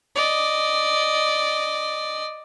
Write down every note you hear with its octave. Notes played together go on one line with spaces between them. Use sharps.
D5 D#5